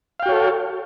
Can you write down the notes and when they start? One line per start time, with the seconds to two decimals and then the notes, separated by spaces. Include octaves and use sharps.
0.20 F5
0.23 G5
0.26 F#4
0.29 C#5
0.32 A4